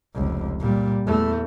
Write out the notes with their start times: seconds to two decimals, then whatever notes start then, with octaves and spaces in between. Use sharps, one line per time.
0.15 F1 C#2
0.60 A#2 G3
1.06 E2 A3